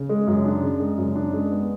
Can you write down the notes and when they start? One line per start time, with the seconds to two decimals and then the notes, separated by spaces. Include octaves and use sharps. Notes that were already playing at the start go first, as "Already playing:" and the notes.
Already playing: C#3
0.09 G#3
0.27 F#2
0.44 D4
0.62 C#3
0.80 G#3
0.97 F#2
1.15 D4
1.33 G#3
1.51 B3